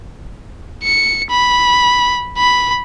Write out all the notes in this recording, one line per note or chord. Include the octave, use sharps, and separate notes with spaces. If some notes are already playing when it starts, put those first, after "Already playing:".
C#7
B5
B5